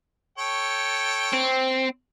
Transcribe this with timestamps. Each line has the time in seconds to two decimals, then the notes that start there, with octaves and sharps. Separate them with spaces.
0.38 A4 C#5 G5
1.33 C4